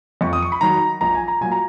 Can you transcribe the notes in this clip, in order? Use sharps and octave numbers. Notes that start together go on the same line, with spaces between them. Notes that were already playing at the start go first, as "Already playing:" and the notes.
F2 C#6
D#6
C#6
B5
D#3 F#3 A#5
A#1 A#5
G#5
A#5
A#2 F#3 G#5
A#5